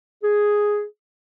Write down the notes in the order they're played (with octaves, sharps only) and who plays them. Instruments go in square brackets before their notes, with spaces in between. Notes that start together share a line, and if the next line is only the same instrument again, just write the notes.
[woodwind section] G#4